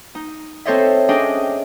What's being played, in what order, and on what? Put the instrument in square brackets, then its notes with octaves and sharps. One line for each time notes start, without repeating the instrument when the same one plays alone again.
[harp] D#4
C4 A4 C5 C#5 D#5 E5
C#4 D4 G#4 D#5 G5